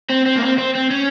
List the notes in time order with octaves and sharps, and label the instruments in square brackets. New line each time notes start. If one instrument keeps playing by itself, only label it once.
[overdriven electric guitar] C4
C4
A#3
C4
C4
C4
C#4